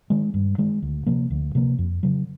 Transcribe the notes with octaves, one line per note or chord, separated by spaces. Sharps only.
D#3 G#3
G2
D#3 G#3
D2
C3 F3 A#3
D2
C3 F3 A#3
F2
C#3 F#3